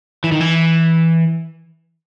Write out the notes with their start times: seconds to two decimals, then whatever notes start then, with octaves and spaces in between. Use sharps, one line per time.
0.24 E3
0.32 D#3
0.41 E3